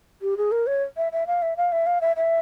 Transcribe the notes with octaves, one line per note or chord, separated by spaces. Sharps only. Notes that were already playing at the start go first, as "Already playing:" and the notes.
G4
G#4
A#4
C#5
E5
E5
F5
E5
F5
E5
F5
E5
E5